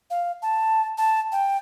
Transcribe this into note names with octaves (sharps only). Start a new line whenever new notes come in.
F5
A5
A5
G5